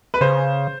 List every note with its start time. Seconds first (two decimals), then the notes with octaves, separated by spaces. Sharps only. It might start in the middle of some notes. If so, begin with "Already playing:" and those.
0.14 B4
0.21 C#3 C5